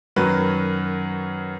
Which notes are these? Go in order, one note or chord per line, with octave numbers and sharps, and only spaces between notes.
F#2 D#3 F#3 B4